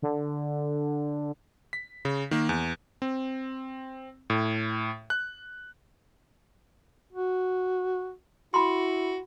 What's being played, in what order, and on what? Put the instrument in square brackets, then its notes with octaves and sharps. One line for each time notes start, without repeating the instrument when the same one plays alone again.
[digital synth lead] D3
[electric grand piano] B6
C#3
D#3 A#3
E2
C4
A2
F#6
[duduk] F#4
[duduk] E4 [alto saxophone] F#4 [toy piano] B5 C6